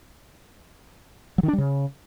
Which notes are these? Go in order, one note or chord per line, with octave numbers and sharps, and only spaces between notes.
F#3
D#3
D4
G3
C#3